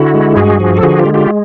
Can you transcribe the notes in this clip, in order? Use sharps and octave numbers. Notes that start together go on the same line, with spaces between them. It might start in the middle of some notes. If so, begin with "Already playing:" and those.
Already playing: D3 E4 F#4
G#3
G2 F#4 G#4
F3
A4
D3 F#4 G#4
F4 G4
G#3
F4 G4